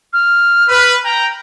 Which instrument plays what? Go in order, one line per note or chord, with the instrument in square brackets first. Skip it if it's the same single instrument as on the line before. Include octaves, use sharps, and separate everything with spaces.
[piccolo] F6
[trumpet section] B4
G5 A#5